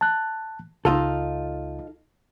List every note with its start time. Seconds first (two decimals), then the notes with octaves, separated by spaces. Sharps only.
0.01 A5 F#6
0.85 C#2 D#4 F4 A4